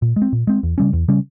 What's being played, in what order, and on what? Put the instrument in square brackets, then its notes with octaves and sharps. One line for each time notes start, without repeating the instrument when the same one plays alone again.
[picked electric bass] A#2
G#3
C4
A#2
G#3 C4
E2
C#3 G3 C#4
E2
C#3 G3 C#4